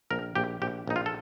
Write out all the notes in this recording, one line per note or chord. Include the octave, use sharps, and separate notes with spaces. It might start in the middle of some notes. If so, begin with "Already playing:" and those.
A#1 A#4
A#1 G4
A#1 G4
A#1 D#4
F4
A4